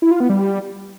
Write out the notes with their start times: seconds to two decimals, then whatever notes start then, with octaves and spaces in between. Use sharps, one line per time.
0.02 E4
0.11 F4
0.20 B3
0.29 G3